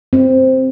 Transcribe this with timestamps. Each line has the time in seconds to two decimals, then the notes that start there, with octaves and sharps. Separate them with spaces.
0.13 C4